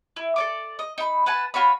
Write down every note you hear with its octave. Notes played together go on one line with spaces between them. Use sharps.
E4
A4 D5 D6
D#5
D#4 B5
B4 F#5 G#5 A5
F4 F#4 C#5 B5